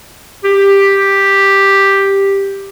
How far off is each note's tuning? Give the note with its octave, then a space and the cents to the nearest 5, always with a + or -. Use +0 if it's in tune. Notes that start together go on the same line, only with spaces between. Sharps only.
G4 +5